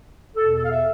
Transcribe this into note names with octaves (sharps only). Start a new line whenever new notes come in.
E2 B2 A4
A4
F5
E5